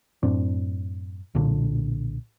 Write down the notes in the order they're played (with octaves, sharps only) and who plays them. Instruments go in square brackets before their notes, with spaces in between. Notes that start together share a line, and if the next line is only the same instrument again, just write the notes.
[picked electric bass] F#2 A2 C4 D4
B1 A#2 D3